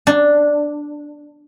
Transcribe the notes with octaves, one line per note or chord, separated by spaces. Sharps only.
D4